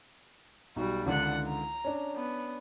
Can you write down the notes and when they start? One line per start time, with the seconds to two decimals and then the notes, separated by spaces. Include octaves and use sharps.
0.76 B1 G3 F#4
1.06 C#2 D3 D#3 D4 F#5
1.46 A#5
1.84 C#4 D4
2.15 B3